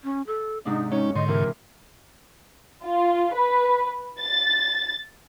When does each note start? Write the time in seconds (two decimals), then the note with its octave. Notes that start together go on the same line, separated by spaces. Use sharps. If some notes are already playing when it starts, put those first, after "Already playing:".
0.04 C#4
0.27 A4
0.65 G#2 C3 D4 D#4
0.92 G#3 C#4 D#4 C#5
1.16 G#2 D3 D#5 C6
1.28 C3 E3 A#4
2.84 F4
3.33 B4
4.20 A6